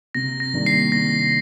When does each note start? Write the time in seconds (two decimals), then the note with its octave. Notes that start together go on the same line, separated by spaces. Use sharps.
0.15 C3 A#6
0.40 A#6
0.54 D#3 G3 A#3 D4
0.66 C7
0.92 C3 A#6